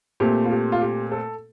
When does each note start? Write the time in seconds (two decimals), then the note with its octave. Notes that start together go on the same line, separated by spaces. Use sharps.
0.20 A#2 A3 C4 G4
0.45 F4
0.51 G4
0.72 F4
0.81 G4
1.12 A4